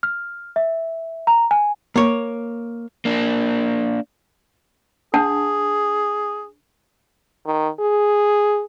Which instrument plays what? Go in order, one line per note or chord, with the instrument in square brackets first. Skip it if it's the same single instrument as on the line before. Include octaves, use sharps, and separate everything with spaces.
[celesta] F6
E5
A#5
G#5
[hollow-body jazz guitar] A#3 C#5
[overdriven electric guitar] A#3 D4
[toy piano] D4 F#5 A5 [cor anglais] G#4
[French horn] D#3
G#4